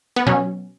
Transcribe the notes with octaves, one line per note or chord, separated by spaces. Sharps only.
B3
B2 F#3 C#4